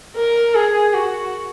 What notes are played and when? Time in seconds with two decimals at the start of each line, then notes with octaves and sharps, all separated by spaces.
0.16 A#4
0.55 G#4
0.94 F#4